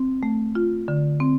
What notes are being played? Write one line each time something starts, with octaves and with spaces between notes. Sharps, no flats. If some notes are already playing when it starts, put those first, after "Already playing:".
Already playing: C4
A3
F4
D3
C4